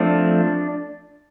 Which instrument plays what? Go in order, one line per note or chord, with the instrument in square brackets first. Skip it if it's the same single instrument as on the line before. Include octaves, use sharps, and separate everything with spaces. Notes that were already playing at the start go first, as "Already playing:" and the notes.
Already playing: [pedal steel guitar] F3 A3 C4 D4